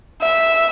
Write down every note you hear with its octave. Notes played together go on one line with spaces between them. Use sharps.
E5